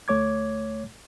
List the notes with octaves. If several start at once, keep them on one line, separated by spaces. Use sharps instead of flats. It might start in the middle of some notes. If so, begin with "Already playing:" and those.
D2 A3 C#5 D6 G#6